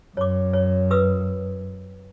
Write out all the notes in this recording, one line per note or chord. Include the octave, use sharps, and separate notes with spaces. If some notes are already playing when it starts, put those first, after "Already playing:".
F#2 C#5 D6
C#5
B4 D#6 E6